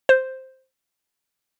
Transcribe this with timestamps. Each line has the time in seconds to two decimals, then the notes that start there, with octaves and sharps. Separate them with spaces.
0.09 C5